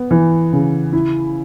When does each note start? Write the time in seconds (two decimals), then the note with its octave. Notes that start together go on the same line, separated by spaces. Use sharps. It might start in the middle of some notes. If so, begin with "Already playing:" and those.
Already playing: B3
0.11 E3
0.53 C#3
0.93 E4